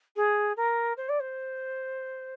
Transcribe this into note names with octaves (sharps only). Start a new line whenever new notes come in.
G#4
A#4
C5
D5
C5